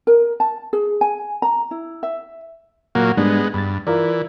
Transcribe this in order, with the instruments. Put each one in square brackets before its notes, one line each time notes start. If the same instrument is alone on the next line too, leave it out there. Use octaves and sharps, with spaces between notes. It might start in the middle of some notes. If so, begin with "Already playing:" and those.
[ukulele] A#4
A5
G#4
G#5
A#5
E4
E5
[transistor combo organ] A#2 F#3 A#3 [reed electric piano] F#5
[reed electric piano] G#2 G3 D4 [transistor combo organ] G#3 B3
[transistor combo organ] G2 [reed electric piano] B5 A6
[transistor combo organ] E3 [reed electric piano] F4 A#4 D5